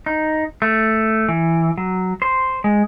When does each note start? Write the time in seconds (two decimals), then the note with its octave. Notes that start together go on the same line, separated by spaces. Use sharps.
0.06 D#4
0.62 A3
1.29 E3
1.78 F#3
2.22 C5
2.64 G#3